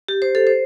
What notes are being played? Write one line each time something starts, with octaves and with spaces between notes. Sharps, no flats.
G4
C5
A4
C5